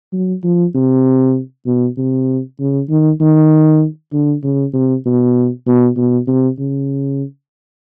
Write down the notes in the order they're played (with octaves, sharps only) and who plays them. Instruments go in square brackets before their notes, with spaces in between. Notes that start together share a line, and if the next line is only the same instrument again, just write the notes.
[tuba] F#3
F3
C3
B2
C3
C#3
D#3
D#3
D3
C#3
C3
B2
B2
B2
C3
C#3